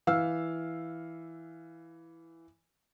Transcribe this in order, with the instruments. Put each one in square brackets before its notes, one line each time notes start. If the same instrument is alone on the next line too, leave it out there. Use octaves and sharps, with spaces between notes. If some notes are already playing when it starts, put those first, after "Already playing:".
[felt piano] E3 F5 E6 F6